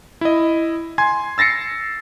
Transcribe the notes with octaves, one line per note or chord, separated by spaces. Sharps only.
E4 D#5
G#5 C6 G#6
E6 A6 A#6 C7 C#7